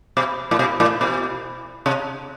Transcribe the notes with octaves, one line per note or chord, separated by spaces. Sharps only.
B2
A2
B2
A2
B2
C3